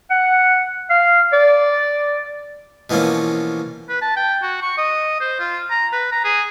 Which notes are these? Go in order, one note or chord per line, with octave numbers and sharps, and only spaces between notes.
F#5
F5
D5
B2 E3 F3 A#3 C#4
B4
A5
G5
F#4
C#6
D#5
C5
F4
A#5
B4
A#5
G#4